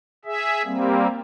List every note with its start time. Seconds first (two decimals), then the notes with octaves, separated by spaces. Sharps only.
0.25 G#4 E5
0.65 G3 A#3 C4